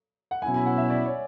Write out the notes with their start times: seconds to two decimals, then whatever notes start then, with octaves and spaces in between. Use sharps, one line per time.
0.31 F#5
0.42 B2 F#3 C#4 E4 G#5
0.54 G#5
0.66 F#5
0.78 E5
0.90 D5
1.05 C#5